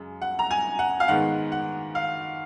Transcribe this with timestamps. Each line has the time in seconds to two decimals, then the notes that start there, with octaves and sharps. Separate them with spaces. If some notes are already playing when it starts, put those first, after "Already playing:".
Already playing: F#2 C#3 G#3
0.22 F#5
0.39 A#5
0.51 G#5
0.79 F#5
1.00 F5
1.08 G#2 D#3 G#3 B3 F#5
1.52 F#5
1.95 F5